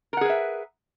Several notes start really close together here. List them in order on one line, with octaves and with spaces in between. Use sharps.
A#4 F#5 G#4 B4 E5